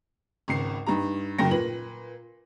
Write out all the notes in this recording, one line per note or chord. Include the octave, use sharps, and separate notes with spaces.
G#1 C#2 C7
G2 D#4 G4 A#5
F#1 C#2 F#2 G5 A#6
A#2 B4 F#7